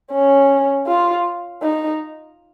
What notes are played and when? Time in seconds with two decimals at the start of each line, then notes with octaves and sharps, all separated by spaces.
0.12 C#4
0.87 F4
1.62 D#4